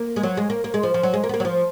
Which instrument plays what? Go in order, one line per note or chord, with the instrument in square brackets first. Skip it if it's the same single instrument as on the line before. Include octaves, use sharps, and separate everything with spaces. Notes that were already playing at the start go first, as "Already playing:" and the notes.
Already playing: [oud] A#3
G#3
F#3
G#3
A#3
A#3
G#3
F3
F3
F#3
G#3
A#3
B3
A#3
F#3
F3